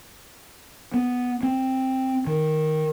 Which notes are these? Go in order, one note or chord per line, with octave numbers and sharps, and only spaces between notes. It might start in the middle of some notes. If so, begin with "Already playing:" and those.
B3
C4
D#3